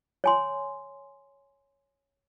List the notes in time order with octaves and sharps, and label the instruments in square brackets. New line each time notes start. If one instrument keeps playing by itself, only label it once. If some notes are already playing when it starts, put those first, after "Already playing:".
[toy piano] C#5 G#5 C6